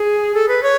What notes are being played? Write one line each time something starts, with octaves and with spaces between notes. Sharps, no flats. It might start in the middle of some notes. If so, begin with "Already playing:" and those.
Already playing: G#4
A4
B4
C#5